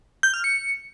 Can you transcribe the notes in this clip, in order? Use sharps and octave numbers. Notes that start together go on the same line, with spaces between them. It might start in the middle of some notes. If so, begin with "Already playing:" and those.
G6
F6
C#7